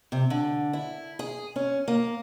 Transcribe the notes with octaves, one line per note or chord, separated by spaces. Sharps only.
C3
D3
E4
G#4
C#4
A#3